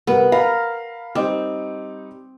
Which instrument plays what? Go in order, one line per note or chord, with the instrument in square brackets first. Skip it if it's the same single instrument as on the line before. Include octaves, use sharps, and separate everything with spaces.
[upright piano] C2 A#4 [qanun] B3
[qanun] A#4 [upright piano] F5 B5
[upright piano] G3 D#4 D6 [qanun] C4